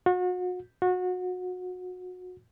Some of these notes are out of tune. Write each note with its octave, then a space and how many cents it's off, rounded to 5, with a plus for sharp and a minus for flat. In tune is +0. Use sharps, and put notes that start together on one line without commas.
F#4 -35
F#4 -25